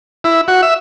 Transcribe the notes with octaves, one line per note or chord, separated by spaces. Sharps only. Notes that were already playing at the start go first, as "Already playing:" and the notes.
E4
F#4
E5